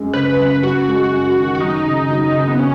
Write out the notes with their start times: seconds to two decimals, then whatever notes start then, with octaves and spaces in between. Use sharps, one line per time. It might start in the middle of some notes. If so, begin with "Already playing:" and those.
Already playing: F#2 G#3
0.13 C#3 B4
0.39 F#2
0.63 F#2 F#4
0.87 G#3
1.11 F#2
1.37 D#3
1.55 F#4
1.61 F#3 D#4
1.85 C#3
2.10 F#3
2.34 C#3
2.48 B3
2.59 C#4